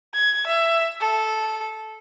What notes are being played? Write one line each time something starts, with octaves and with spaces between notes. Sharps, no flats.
G#6
E5
A4